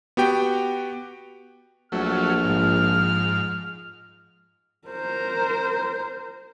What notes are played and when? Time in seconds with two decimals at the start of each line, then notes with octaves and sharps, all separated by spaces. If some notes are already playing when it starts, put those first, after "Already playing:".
0.17 B3 F#4 G4 G5
1.92 A#1 F#3 A3 F6
2.44 G#2 F3
4.88 A#4 C5